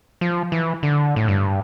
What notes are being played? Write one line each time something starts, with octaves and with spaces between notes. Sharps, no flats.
F3
E3
D3
A2
G2